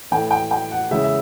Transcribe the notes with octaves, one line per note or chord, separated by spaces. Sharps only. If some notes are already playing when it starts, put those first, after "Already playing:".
A2 E3 A3 G5
G5
G5
F#5
C#3 E3 G#3 E5
E5